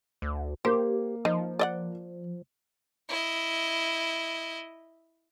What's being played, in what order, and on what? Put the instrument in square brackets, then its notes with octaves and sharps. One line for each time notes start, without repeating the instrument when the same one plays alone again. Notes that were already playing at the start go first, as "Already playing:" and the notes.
[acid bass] D2
[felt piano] A#3 [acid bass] G4 [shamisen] C5
[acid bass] F3 [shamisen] D#4
[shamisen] D5 D#5 F#5
[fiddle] E4 D#5